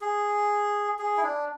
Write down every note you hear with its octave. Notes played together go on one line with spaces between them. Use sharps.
G#4
G#4
E4
D4